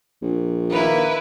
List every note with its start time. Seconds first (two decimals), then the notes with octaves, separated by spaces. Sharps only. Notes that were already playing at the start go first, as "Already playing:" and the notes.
0.22 A#1
0.71 D#3 A#3 E4 B4